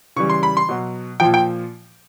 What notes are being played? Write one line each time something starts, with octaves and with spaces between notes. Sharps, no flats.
C#3 E3 G3 C#6
C6
B5
C6
B2 F#3
A#2 F3 G5
G5